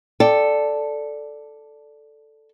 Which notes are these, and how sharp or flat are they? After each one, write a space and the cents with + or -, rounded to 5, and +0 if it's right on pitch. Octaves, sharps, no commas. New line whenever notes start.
A4 +0 D5 +0 G5 +0